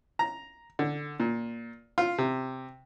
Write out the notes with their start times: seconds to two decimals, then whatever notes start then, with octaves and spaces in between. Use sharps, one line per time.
0.19 A#5
0.79 D3
1.20 A#2
1.98 F4
2.18 C3